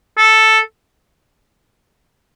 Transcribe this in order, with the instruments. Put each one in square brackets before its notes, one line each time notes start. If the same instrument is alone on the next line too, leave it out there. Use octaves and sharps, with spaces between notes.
[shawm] A4